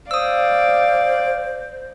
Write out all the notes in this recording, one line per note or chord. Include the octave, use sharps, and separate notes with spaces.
C5 D5 F5 D#6 E6